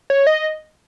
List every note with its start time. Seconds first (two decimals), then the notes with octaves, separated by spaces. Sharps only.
0.10 C#5
0.27 D#5